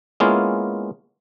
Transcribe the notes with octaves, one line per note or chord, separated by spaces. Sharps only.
G#3 A#3 B3 C#4 E4 F4